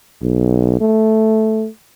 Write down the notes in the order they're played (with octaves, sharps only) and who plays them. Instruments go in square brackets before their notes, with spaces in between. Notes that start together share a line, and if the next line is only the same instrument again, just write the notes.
[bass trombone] B1
A3